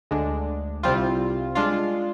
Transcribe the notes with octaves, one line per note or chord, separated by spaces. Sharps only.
D2 D3 G#3 D4
C2 C3 G3 C4 F4
G#3 D4 F4